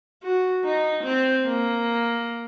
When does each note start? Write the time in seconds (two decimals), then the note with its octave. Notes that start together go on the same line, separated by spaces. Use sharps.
0.23 F#4
0.64 D#4
1.04 C4
1.45 A#3